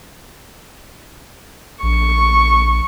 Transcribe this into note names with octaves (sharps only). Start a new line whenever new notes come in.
A#1 C#6